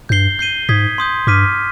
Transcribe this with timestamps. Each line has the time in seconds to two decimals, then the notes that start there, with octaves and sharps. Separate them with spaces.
0.09 G2 G6 C7 G7
0.39 G6 C7 D#7 G7
0.69 G#2 D#6 G#6 B6
0.98 C6 D#6 G6
1.27 G2 D6 F6 B6 D#7